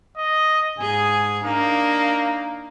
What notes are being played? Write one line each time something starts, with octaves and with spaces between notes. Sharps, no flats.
D#5
G#2 G#4 G#5
A#3 D4 D#4